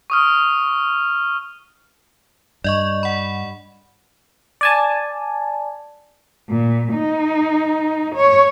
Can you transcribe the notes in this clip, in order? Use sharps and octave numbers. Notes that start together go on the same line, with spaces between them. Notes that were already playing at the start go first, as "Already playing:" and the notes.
C#6 D#6 F6
G2 D5 D#5 C#6
F#5 B5
D5 G#5 A5
A#2
D#4
C#5